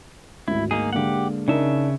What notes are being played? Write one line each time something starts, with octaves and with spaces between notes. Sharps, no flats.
G#1 D2 E4
A#3 D#4 G#4
D3 G#3 A#3 G4 F#5
C#3 D4 D#4 A#4 E5